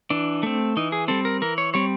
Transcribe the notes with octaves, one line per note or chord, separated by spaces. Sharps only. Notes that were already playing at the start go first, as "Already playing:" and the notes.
E3 D4
A3 C4
E3 D#4
G#4
G3 C4 A4
A#4
E3 A#4
C#5
G3 C4 C#5